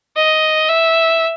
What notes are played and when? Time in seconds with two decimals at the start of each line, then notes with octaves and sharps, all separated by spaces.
0.17 D#5
0.69 E5